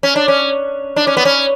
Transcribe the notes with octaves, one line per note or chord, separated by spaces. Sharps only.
C#4
D4
C#4
D4
C#4
B3
C#4